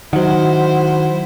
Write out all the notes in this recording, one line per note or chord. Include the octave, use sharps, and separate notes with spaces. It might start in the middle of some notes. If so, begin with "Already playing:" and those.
D#3 F#3 E4 C5 F#5